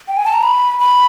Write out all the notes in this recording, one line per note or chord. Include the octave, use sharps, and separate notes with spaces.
G5
G#5
A5
A#5
B5
B5